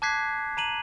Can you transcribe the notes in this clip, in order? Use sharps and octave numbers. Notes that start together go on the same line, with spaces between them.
A5 D6 F#6 G#6 B6 C7
A#5 D#7 F#7